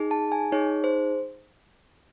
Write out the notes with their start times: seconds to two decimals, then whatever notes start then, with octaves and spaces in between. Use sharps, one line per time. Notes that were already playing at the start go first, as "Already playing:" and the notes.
Already playing: D#4 G#4
0.11 A5
0.32 G#5
0.52 D#4 G#4 C#5
0.84 C5